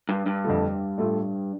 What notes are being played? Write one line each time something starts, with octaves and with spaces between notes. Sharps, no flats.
G2
G2
F2 D3 A3
A2 A3 F4 A4